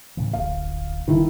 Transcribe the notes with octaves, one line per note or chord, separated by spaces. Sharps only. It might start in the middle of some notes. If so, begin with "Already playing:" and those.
A2 C#3 E3
D1 G1 F5
D#1 G2 D#3 E4